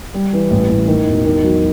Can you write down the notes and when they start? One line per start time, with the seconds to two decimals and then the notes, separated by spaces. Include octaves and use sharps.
0.14 G3
0.33 E3
0.51 A1
0.69 A1
0.88 D#3
1.07 E1
1.25 D#3
1.43 F#3